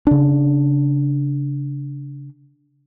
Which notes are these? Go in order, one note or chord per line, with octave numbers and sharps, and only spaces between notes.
C#3 D4